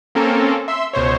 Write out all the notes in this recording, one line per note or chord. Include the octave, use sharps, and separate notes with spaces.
A#3 C4 C#4 A4 A#4
E5 C6 E6
C#2 B2 C5 C#5